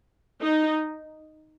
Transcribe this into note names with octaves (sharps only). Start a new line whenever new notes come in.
D#4